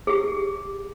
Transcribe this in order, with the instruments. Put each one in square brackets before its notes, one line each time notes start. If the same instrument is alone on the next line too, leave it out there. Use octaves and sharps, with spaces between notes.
[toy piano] G4 G#4